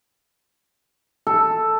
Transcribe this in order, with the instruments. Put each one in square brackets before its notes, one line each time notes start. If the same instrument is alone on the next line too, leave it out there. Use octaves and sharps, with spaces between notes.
[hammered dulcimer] A4